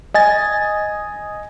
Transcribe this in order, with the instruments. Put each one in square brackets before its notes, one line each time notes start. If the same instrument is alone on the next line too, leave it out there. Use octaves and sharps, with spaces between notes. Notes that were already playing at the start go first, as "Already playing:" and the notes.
[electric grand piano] D#5 G#5 A6